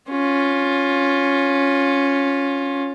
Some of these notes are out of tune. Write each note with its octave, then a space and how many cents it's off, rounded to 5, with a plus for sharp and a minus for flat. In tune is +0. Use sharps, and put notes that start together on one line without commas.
C#4 +0 F4 +15